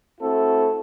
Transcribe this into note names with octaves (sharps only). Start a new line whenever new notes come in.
A3 C4 E4 F#4 A4